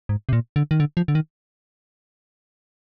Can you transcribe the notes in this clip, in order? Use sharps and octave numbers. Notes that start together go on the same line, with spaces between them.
G#2
C3
A#2
D3
D#3
D3
F3
D3
D#3